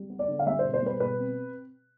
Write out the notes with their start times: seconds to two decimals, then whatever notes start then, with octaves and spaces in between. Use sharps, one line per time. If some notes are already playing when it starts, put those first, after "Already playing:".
Already playing: G3
0.10 B3
0.19 D5
0.28 D3
0.39 F5
0.46 G3 E5
0.59 B2 C5
0.74 C5
0.82 G3 B4
1.00 B2 B4
1.18 C4